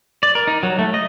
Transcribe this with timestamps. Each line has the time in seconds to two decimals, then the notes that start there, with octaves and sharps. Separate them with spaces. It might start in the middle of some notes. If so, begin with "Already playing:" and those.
0.23 D5
0.35 A#4
0.47 D#4
0.63 F#3
0.79 A3
0.94 D#5